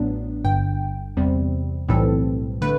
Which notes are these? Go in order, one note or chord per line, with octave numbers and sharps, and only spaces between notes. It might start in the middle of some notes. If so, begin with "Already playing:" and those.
Already playing: A1 A2 F#3 B3 D4
G1 G2 D3 G5
E2 C3 G3 C4
B1 A2 E3 G3 C4 A4
D3 A3 B4